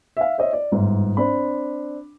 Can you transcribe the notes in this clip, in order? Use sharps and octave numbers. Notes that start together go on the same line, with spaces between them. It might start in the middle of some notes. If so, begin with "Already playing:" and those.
E5 F5
C5 C#5 D#5 E5
D5
G1 G#2
C4 D4 B5